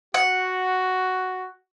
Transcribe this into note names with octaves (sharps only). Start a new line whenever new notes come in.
F#4 F#5